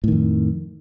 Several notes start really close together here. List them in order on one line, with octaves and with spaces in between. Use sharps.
A2 D#3 F2